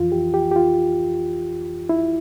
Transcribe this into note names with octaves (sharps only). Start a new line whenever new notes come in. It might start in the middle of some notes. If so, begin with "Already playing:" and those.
Already playing: F2 E3 F4
G4
G4
G4
F4
E4